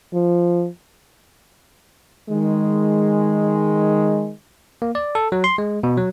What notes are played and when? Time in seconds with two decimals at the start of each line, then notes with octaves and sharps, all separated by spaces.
0.14 F3
2.30 D#3 G#3
4.82 A#3
4.95 D5
5.15 A4
5.32 F#3
5.44 C6
5.58 G#3
5.83 B2
5.97 F#3